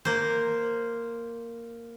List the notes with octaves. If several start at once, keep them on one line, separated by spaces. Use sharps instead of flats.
A#3 C5